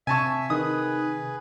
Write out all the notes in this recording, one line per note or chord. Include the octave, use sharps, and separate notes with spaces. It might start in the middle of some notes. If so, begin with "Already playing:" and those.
C3 C4 E5 G#5 A5 C#6
D#3 G#4 B4 D#6